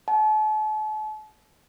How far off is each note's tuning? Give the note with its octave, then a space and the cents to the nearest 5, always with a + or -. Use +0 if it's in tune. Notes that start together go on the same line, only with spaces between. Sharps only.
F#5 +30 A5 -40